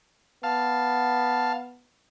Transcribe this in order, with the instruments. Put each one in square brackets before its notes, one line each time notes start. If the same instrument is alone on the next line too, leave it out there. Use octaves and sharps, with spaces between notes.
[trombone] B3 [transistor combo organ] F5 A5